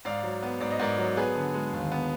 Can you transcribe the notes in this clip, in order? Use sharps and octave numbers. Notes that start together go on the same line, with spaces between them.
G#2 D5 F5
F#3
B3
G#2 D5
D#5
G#2 A#4 D5
F#3
B3 G#4 B4
D3
G#3
D#2
B3